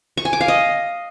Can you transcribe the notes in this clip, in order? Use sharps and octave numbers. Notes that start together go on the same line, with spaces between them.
C#6
G#5
D6
F5
D#5